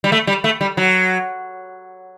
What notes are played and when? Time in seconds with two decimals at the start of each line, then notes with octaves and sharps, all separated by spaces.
0.04 G3
0.12 A3
0.27 G3
0.44 A3
0.61 G3
0.77 F#3